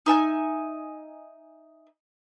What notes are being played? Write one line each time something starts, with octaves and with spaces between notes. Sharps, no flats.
D#4 E5 G#5 G6